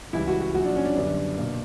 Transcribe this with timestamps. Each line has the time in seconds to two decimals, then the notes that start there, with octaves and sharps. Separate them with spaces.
0.13 C#2 C#3 E3 G3 E4
0.28 F#4
0.41 F#4
0.54 A#1 A#2 F#3 F#4
0.65 D4
0.76 C#4
0.86 D4
0.96 F#2 D3 G3 B3 D4
1.38 B2 A#3